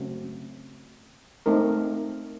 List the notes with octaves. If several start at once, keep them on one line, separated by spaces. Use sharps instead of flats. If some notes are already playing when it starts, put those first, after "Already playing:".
Already playing: C#3 F#3 A3 C4
A3 C4 D#4 A#4